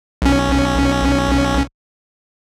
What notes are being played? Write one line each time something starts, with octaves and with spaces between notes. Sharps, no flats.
B1 C#4